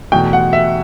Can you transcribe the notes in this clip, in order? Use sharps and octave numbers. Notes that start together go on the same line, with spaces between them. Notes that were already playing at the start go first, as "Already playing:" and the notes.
E2 B2 A3 G5
F#5
E5